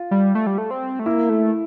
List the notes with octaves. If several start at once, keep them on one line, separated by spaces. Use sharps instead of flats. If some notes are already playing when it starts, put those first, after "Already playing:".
Already playing: F4
G3
A3
G3
A3
C4
A3
A#3 E4
A3